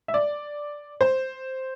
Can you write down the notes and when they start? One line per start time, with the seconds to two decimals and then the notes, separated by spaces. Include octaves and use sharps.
0.08 E5
0.14 D5
1.01 C5